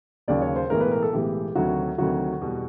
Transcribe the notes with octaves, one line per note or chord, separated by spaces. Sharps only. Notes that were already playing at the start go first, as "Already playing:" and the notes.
D#2 C#3 F#3 D5
C#5
C5
B1 A2 E3 G#3 A#4
B4
A#4
A4
B1 A2 E3 G#3 G4
D2 C3 D#3 F#3 F#4
D2 C3 D#3 F#3 F#4
E2 B2 G3